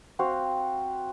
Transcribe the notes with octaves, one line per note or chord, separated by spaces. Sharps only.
C4 F#4 F5